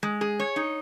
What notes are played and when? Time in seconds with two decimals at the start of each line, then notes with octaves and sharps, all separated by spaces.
0.03 G#3
0.21 G#4
0.40 C#5
0.56 D#4